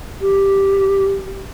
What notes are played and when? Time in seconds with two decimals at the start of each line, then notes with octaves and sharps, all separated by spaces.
0.21 G4